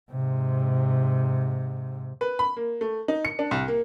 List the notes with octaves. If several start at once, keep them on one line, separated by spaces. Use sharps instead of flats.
G#2 C3
B4
B5
A#3
A3
D#4
C#7
D4
C2
A#3